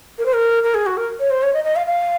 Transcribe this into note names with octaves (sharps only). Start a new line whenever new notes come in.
A#4
C5
A#4
A#4
G#4
F#4
A#4
C#5
C5
C#5
D#5
D#5
F5
F5